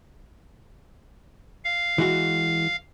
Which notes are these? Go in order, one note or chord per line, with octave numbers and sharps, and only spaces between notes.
F5
E3 G#3 F#4